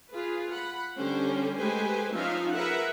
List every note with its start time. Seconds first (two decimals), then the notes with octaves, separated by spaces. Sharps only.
0.11 F4 G#4 B4
0.51 F#5 B5
0.97 D3 G3 C#4 G4 C5
1.59 G#3 A3 G4 B4 C5 G#5
2.12 F3 C#4 D#4 F4 E5 F5
2.52 G#4 A#4 B4 E5 F#5